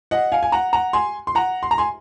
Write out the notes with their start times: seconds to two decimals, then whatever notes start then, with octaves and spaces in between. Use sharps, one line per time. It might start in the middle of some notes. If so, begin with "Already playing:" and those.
0.11 D#5 F#5
0.32 F5 G#5
0.43 G#5
0.52 F#5 A#5
0.73 F#5 A#5
0.93 G#5 C6
1.27 C6
1.35 F#5 A#5
1.63 C6
1.71 A#5
1.78 G#5 C6